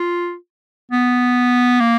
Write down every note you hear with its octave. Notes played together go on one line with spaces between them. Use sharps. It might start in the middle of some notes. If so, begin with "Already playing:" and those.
Already playing: F4
B3
A#3